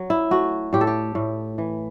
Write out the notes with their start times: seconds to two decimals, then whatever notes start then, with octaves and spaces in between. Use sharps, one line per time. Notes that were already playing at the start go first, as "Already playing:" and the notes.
Already playing: F#3
0.10 E4
0.31 A3 F#4
0.73 A2 G4
0.81 A4
0.87 G4
1.15 A2
1.58 E3